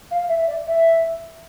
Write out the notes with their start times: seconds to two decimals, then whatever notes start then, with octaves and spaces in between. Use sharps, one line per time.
0.11 F5
0.28 E5
0.47 D5
0.67 E5